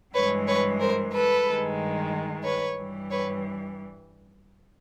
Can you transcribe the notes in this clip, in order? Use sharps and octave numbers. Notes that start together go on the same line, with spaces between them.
G2 E3 G#3 B4 C#5
B4 C#5
A#4 C5
A4 B4
G2 D#3 G#3
B4 C#5
G2 E3 G3
B4 C#5